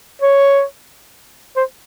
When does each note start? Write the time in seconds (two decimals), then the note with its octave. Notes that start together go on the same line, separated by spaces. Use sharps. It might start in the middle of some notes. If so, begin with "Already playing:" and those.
0.22 C#5
1.57 C5